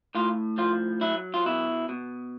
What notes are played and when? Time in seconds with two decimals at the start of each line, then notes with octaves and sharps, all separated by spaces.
0.15 A2 F4
0.58 F3 F4
1.01 F#3 E4
1.34 F4
1.45 B2 E4
1.89 B2